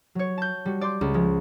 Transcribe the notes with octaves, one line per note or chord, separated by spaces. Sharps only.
F#3 C#5
A5 G6
G3 F#4
D5 C6 D6 G6
C#2
F3 G#3